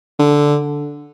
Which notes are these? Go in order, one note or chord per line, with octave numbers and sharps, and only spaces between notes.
D3